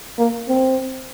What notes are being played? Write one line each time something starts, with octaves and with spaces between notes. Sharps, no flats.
A#3
C4